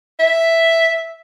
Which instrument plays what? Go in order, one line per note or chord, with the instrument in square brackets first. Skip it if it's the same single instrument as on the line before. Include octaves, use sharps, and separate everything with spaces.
[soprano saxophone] E5